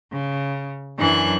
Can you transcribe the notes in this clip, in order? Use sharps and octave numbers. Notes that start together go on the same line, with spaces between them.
C#3
F#2 E3 F#3 D4 G#5 F#6